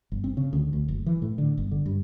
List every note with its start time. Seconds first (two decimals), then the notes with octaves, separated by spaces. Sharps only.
0.12 G1
0.24 C4
0.37 C#3
0.53 D2
0.73 D2
0.88 F#1
1.06 E3
1.22 A2
1.38 D3
1.58 G1
1.71 D3
1.86 G2